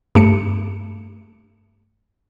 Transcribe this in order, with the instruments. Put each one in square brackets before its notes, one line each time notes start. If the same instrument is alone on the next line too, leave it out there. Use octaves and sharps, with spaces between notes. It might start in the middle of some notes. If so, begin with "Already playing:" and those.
[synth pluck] G2 A3 C#7